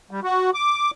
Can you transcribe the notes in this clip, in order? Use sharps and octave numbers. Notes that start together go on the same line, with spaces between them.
G3
F#4
D6